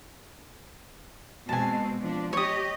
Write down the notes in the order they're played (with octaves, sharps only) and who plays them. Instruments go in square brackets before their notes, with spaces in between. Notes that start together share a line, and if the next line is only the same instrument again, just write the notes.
[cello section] B2 G#3 C4 [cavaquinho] G#5 A5
[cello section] F3 D4
[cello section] G4 D#5 [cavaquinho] C#5 D#6